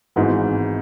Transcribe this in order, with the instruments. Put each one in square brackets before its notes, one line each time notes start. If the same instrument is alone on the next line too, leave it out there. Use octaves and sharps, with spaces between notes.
[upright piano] G#1 G#2 E3 B3 F#4